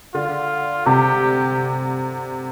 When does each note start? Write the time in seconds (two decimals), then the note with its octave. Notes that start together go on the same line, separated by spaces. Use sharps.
0.14 D3 F4
0.86 C3 G4